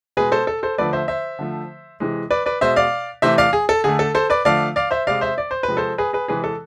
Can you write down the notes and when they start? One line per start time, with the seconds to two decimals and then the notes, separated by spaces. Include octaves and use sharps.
0.17 B2 G#3 G#4 B4
0.32 A4 C5
0.47 A4
0.63 A4 C5
0.78 D3 F3 A3 B4 D5
0.93 C5 E5
1.08 C5 E5
1.39 D3 F3 A3
2.00 C3 E3 G#3
2.31 B4 D5
2.46 B4 D5
2.61 B2 G#3 C5 E5
2.76 D5 F5
3.22 C3 E3 A3 C5 E5
3.38 D5 F5
3.53 G#4
3.69 A4
3.84 D3 A3 G#4
3.99 A4
4.15 A4 C5
4.30 B4 D5
4.45 D3 F3 A3 D5 F5
4.76 D5 F5
4.91 C5 E5
5.07 C3 G#3 D5 F5
5.21 C5 E5
5.38 D5
5.51 C5
5.63 B4
5.68 C3 F3 G#3
5.77 A4 C5
5.98 G#4 B4
6.13 G#4 B4
6.28 C3 E3 G#3 G#4 B4
6.44 A4